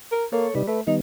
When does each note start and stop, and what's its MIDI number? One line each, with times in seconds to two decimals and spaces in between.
0.12 0.25 70
0.33 0.47 58
0.33 0.54 69
0.33 0.54 73
0.55 0.63 48
0.55 0.63 55
0.55 0.63 63
0.55 0.63 71
0.67 0.81 57
0.67 0.81 71
0.87 1.00 51
0.87 1.00 55
0.87 1.00 59
0.87 0.95 63